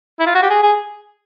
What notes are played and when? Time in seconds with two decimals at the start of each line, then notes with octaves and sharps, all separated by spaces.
0.20 E4
0.27 F4
0.35 F#4
0.43 G4
0.50 G#4
0.63 G#4